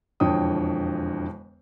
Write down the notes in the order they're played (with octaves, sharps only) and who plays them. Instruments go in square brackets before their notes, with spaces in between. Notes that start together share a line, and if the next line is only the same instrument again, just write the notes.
[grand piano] E1 F2 D3 C#5 G5 D#6